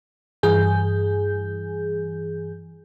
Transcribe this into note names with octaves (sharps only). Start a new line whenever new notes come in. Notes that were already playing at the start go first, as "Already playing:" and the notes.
G2 E3 G#4 G6